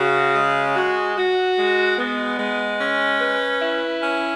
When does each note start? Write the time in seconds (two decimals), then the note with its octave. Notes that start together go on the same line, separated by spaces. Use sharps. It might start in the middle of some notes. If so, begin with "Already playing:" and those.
Already playing: C#3 F#4
0.35 G#3
0.76 F#4
1.17 F#4
1.58 G#3
1.99 B3
2.39 G#3
2.80 C#4
3.21 B4
3.62 E4
4.03 C#4